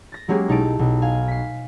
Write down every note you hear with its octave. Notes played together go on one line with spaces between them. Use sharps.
A6 A#6
F#3 G#3 A#3 C#4 G4 G#4
B1 D#4 E4 A5 D7
B1
F5 G#5 F6
B6 C7